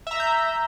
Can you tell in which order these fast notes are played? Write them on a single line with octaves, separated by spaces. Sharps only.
E5 A#5 E6 G6